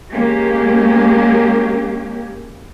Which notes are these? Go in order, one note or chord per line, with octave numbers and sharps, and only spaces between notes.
G#3 A#3 C#4 G4